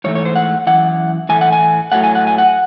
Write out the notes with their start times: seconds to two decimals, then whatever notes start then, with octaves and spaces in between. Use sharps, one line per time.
0.04 G#2 E3 A3 C#5
0.15 C#5
0.25 C5
0.36 F#5
0.67 F#2 E3 F#5
1.29 A2 E3 A3 G#5
1.41 F#5
1.52 G#5
1.92 A2 F#3 A3 F#5
2.04 G#5
2.15 F#5
2.27 G#5
2.38 F#5